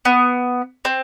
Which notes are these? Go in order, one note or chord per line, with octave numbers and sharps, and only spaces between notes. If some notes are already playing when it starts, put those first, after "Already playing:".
B3
C4